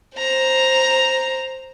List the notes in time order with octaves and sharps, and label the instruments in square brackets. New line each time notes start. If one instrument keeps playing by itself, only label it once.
[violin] C5 A#5